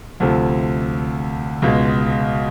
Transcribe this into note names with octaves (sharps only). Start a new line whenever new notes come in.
D2 C3 F3 A3
C#2 B2 G#3